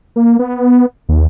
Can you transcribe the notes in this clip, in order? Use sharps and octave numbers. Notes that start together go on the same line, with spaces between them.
A#3
B3
D#2